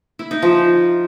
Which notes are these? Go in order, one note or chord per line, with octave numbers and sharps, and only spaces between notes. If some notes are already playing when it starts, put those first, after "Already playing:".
E4
D#4
F3